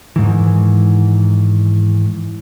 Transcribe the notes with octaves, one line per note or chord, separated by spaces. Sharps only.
G#2 D#3 E3